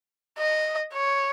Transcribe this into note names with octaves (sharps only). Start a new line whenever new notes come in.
D#5
C#5